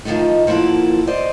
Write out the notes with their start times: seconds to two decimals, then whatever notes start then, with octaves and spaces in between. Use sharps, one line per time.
0.05 D#3 F3 F#3 A3 D#4
0.47 F3 A#3 E4 F#4 A4
1.07 C5 D5 D#5